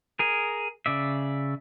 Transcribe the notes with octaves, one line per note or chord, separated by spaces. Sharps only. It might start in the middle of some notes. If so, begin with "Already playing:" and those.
G#4 A#4
C#3 D5 E5